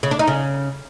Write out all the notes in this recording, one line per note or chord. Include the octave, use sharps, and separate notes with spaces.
C#3
D4
D#4
C#3